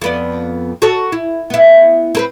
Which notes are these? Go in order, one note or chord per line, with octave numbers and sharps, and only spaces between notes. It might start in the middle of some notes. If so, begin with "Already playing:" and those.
F2 B3 D5
F#4 A4 C#5
E4
B3 E4
C4 A#4 B4